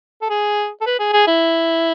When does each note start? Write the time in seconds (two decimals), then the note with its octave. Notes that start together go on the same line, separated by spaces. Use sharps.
0.22 A4
0.30 G#4
0.81 A4
0.86 B4
0.99 G#4
1.13 G#4
1.27 E4